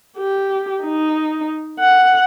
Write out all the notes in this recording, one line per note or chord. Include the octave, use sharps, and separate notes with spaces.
G4
D#4
F#5